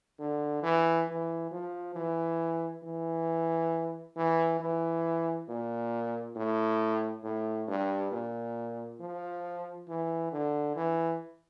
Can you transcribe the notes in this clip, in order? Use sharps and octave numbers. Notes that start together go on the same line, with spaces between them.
D3
E3
E3
F3
E3
E3
E3
E3
A#2
A2
A2
G2
A#2
F3
E3
D3
E3